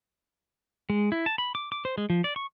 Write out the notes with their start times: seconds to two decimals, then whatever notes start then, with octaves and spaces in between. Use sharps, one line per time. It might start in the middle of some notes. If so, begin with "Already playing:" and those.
0.90 G#3
1.12 E4
1.26 A5
1.38 B5
1.55 D6
1.72 D6
1.85 C5
1.98 G#3
2.10 F3
2.24 D5
2.36 C#6